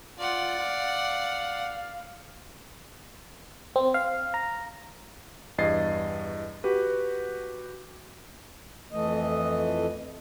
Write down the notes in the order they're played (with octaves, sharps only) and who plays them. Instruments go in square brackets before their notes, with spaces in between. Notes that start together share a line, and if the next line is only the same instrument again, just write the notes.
[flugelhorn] F4 [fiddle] D5 F#5
[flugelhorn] F5
[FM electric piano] C4
F5
A#5
[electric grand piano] E2 G2 D#5 G#6 A6 C7
F#4 G4 B4
[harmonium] F2 E3 A3 D#5